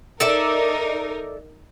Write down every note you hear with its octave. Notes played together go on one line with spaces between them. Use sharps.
D#4 A4 A#4 D5 E5